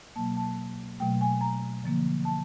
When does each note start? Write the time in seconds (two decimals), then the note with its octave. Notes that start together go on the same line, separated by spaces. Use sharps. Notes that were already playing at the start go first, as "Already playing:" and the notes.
0.16 B2 F#3 A#3 A5
0.37 A5
1.00 B2 F#3 A3 G5
1.21 G#5
1.41 A#5
1.83 D3 F3 A#3
2.25 A5